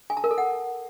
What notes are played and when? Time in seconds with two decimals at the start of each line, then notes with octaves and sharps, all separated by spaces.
0.10 G#5
0.17 A5
0.24 A#4
0.31 A4
0.38 F#5